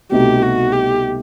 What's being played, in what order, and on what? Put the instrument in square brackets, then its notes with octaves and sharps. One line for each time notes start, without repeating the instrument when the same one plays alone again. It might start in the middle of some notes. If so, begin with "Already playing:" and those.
[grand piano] C2 B2 A3 D#4 [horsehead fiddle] G4
[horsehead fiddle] F#4
G4